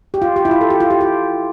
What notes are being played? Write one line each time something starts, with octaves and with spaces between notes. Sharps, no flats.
G4
F4
G4
E4
F4
A4
G4
F4
G4
G4